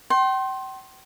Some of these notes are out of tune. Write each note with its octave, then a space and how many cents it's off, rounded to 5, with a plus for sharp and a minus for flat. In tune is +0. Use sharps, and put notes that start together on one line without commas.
G5 -40 C6 +20